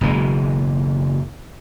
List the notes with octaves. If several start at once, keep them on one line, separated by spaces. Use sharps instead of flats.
F#1 B2 E3 G#3